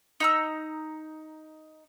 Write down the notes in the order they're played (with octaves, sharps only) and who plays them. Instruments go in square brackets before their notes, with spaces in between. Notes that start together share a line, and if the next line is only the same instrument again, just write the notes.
[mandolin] D#4 A#5 E6